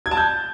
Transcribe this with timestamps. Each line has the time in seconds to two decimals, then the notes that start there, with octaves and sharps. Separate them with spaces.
0.06 G#6
0.11 A5
0.17 G6